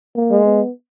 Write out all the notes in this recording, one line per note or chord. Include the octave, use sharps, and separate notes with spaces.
A#3
G#3
B3